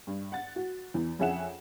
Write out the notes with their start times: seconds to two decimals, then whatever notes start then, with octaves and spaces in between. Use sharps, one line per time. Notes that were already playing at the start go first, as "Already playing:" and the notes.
0.07 G2
0.32 F#5 A6
0.56 F#4
0.94 E2 E3
1.19 F2 C#4 G#4 E5 F#5 E7